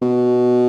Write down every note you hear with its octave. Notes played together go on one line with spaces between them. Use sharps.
B2